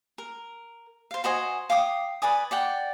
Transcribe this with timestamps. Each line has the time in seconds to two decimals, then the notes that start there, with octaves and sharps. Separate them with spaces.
0.18 A#4
1.11 C5 F5
1.24 F#4 C5 D#5 G#5
1.70 F5 G5 D6 D#6
2.22 B4 D5 G#5 D#6
2.51 D5 F#5 G5